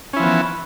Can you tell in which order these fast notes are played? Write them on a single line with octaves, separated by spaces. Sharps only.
C#4 E4 F3 B3 E3